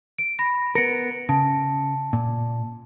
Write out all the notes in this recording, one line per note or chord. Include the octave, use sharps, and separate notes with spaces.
D7
B5 A#6
B3 A#4 A#6 C#7 D7
C#3 A5
A#2